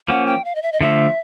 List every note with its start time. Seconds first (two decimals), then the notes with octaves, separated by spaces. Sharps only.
0.08 F3 A#3 C#4 F#5
0.26 G5
0.45 F5
0.55 D#5
0.62 E5
0.72 D#5
0.81 D3 F3 A3 E5